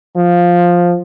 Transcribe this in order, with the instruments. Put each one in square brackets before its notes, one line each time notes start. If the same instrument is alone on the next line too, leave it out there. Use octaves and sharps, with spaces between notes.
[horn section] F3